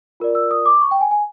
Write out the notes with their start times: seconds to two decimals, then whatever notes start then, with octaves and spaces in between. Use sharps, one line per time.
0.20 F4 A#4 D5
0.35 E6
0.51 D#6
0.66 D6
0.81 C#6
0.91 G5
1.01 G#5
1.11 G#5